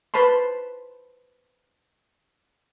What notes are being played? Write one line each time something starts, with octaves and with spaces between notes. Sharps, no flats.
B4 C5 A5 B5 C6